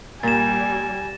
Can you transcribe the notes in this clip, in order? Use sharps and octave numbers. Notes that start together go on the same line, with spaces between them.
A#2 G3 G#5 A6 A#6 E7